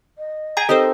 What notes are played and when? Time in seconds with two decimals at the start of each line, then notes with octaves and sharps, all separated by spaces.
0.18 D#5
0.57 G#5 A#5
0.69 C4 D#4 G4 A4 A#4 C5 D#5